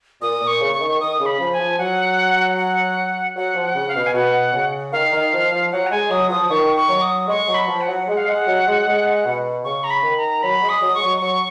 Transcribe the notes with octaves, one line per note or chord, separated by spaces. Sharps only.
A#2 D#6
A#2
C#6
C#3
C#6
D#3
C#6
D#3 D#6
C#3
B5
F3
G#5
F3
F#3 F#5
F#5
F#3 F#5
F3
F#5
C#3
F5
B2
G#5
B2 F#5
C#3
D#3 F5
D#3
F3
F3
F#3 F#5
A#5
G#3 G#5
F#3 D#6
F3 D#6
D#3 C#6
C#6
F#3
D#6
G#3 C#6
F#3
B5
F3
F#5
F#3
G#3 F#5
F5
G#3 F#5
F#3
G#3
G#3
B2
C#3 C#6
A#5
B5
D#3
A#5
F#3 B5
G#3
D#6
F#3
G#3 C#6
F#3
F#3 C#6